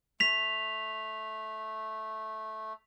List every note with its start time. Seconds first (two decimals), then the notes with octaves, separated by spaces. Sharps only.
0.20 A3 B6 F7